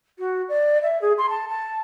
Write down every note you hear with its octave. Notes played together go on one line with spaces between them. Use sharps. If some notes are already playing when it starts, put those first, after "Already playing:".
F#4
D5
E5
G#4
C6
A5
A5